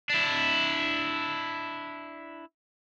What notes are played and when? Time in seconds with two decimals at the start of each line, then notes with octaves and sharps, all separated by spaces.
0.10 D4 E4